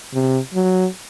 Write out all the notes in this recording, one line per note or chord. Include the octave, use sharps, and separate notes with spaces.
C3
F#3